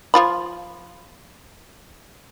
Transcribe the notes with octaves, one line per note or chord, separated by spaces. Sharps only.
F3 F4 B5